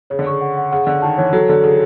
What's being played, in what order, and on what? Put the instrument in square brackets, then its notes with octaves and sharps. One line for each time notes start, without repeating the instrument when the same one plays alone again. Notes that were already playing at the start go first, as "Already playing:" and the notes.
[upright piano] C#3 [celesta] C#5
[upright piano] D3
[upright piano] C#3 [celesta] C#6
[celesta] F#5
F#5
[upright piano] C#3 [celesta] F#5
[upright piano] D3 [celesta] F#5
[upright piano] D#3 [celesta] A5
[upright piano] E3 [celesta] C#5
[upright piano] F#3 [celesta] A4
[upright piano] D3 [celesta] A4
[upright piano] C#3 [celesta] A4